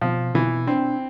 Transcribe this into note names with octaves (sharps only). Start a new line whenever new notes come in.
B2 F3
B2 E3
C4 D4